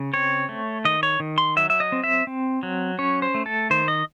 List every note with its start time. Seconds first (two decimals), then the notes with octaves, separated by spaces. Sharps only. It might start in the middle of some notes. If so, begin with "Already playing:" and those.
Already playing: C#3
0.13 C4 C#5
0.49 A3
0.85 D#3 D#5
1.03 C#5
1.20 D#3
1.38 C6
1.56 F#3 E5
1.70 E5
1.80 D#5
1.92 C4
2.04 E5
2.27 C4
2.63 F#3
2.98 C#4 C#5
3.22 C5
3.35 A3
3.46 A4
3.70 D#3 C5
3.88 D#5